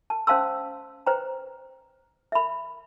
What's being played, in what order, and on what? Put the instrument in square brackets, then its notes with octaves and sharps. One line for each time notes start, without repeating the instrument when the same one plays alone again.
[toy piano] A5
C#4 C5 F5 A5 C6 E6
B4 C5 G5 A#5
E5 B5